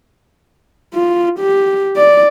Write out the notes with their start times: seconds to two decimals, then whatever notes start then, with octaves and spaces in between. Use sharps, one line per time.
0.94 F4
1.39 G4
1.96 D5